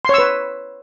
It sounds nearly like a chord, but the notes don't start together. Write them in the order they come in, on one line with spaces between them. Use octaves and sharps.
C6 C#5 E6 B4